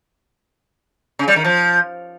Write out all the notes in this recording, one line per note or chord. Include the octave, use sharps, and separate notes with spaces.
C#3
G3
D#3
F3